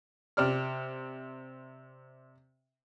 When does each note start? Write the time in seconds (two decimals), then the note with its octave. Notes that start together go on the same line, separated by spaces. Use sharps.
0.37 C3 D5 F6